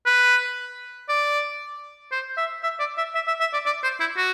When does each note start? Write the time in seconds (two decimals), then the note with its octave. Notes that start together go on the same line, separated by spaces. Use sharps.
0.06 B4
1.09 D5
2.12 C5
2.37 E5
2.63 E5
2.80 D5
2.97 E5
3.15 E5
3.27 E5
3.40 E5
3.53 D5
3.66 D5
3.83 C5
4.00 E4
4.17 F#4